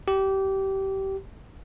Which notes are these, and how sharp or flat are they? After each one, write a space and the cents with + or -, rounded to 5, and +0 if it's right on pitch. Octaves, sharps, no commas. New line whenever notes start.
G4 -20